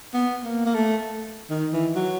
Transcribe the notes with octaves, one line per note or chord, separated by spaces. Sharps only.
B3
A#3
A#3
A3
D#3
E3
F#3